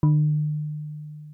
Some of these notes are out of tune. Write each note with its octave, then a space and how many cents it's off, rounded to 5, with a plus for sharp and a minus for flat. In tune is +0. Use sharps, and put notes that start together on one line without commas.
D3 +45